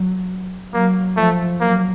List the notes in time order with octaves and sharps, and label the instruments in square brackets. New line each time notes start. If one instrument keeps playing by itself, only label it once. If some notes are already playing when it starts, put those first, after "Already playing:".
Already playing: [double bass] F#3
[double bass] F#3 [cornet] A#3
[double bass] F3 [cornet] A3
[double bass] F#3 [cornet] A#3